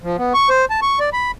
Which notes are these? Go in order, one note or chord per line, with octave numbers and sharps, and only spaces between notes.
F3
B3
C#6
C5
A5
C#6
D5
B5